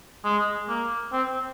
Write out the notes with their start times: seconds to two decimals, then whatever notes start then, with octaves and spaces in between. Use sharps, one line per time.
0.24 G#3
0.69 A#3
1.13 C4